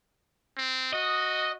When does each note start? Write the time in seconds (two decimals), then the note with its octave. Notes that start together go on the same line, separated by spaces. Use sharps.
0.57 C4
0.93 F#4 D#5